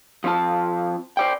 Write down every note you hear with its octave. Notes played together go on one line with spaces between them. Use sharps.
F3 C4 F4 A5
C5 D5 G5